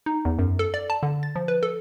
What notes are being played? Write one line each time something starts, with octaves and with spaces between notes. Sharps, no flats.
D#4
E2
F#2
A4
D5
A5
D3
A6
F3
B4
A4